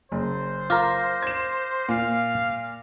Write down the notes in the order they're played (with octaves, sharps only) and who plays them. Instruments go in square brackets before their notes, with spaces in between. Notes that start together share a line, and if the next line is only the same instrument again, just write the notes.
[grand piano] F#1 [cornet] C5
[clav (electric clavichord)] F4 A#4 [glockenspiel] D6 F6 A#6
[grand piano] G#6 E7
[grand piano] A#2 [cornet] F5